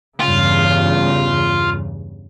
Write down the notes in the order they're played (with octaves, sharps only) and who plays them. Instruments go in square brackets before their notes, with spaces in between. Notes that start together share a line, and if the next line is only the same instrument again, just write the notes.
[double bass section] E2 G2 C#3 [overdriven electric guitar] F4